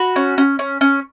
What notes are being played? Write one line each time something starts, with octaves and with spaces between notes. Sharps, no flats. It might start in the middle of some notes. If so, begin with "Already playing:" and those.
Already playing: F#4 B5
C#4
C#4
C#4
C#4